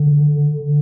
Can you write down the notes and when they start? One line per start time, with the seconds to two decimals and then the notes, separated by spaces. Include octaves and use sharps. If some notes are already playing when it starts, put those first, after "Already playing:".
Already playing: D3